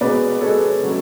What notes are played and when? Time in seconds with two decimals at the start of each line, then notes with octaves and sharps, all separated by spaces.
0.01 B2 G#3 B3 B4 D5
0.41 B2 G#3 B3 A4 C#5
0.81 C#3 F#3 A3